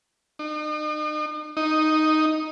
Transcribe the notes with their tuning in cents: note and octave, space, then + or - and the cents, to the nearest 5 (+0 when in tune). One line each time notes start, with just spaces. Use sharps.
D#4 -40
D#4 +0